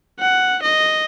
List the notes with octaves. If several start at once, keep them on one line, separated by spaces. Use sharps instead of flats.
F#5
D#5